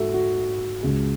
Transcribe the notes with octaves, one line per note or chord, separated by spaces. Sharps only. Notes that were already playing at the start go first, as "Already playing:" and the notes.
Already playing: G#2 G#3 F#4 A4 E5
F#4
C#2 C#3 G#3